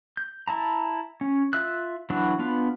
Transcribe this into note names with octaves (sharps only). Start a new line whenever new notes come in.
G6
E4 A5 A#5
C#4
F4 E5 E6 F#6
E3 F#3 D4 E4 F#4
B3 D4 F4 B4